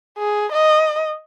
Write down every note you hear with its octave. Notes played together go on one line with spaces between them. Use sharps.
G#4
D#5